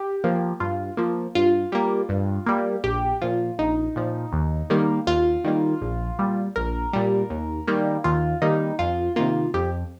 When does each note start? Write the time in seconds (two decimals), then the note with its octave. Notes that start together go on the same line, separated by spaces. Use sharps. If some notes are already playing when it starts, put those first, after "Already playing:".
Already playing: G4
0.24 F3 A#3
0.60 G2 F4
0.97 F3 A#3
1.35 G2 F4
1.72 G3 A#3
2.09 G2
2.46 G3 A#3
2.83 A#1 G4
3.22 A#2 F3 F4
3.59 A#1 D#4
3.96 A#2 F3
4.33 D#2
4.70 D#3 G3 A#3
5.07 D#2 F4
5.44 D#3 G3 A#3
5.81 A#1
6.19 A#2 G3
6.56 A#1 A#4
6.93 A#2 G3
7.30 D#2
7.68 D#3 G3 A#3
8.04 D#2 F4
8.42 D#3 G3 A#3 D#4
8.79 F2 F4
9.16 C3 D#3 A#3 F4
9.54 F2 G4